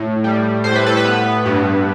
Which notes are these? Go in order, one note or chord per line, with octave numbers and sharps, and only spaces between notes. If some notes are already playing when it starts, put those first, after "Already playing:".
Already playing: A2
G3
A2 C5
B4
A4
B4
B3
G2